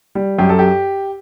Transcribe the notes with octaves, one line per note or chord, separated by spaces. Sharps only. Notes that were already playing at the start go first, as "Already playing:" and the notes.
G3
F#2 G4
A4
G4